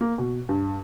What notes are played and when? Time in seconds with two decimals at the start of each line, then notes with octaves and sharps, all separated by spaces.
0.01 A#3
0.18 B2
0.49 G2